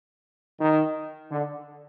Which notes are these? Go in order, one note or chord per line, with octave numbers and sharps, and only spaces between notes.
D#3
D3